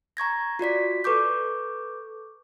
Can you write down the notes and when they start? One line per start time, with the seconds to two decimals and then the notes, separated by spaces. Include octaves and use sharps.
0.17 A#5 C#6 G#6 A#6
0.59 F4 F#4 D5 B6
1.04 A4 B4 C#6 D6 G6